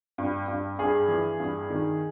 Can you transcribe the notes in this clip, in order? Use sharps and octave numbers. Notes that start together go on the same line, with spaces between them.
G2
G2
G2 G#4
E3
G2
D#3